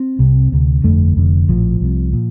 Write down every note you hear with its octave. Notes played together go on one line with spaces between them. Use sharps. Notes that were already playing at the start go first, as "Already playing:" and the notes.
Already playing: C4
C2 C3
D2 C3
G1 F2 D3 A3
F1 F2 D3
A#1 A2 F3
C2 C3
A#2